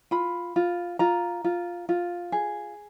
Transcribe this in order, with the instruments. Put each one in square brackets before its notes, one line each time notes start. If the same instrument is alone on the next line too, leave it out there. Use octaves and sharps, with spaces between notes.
[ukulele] F4 B5
F4
F4 A#5
F4
F4
G#4